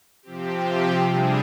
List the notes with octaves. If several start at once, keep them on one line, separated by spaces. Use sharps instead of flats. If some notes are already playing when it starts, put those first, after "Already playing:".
C3 F3 C4 G4
C3 G3 D4 G#4